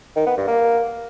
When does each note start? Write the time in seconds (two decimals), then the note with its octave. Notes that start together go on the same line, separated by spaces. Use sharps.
0.16 D#3
0.27 B3
0.37 G2
0.48 A#3